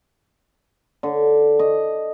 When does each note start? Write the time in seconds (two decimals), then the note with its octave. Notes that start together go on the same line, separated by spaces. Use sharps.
1.03 D3
1.59 D#5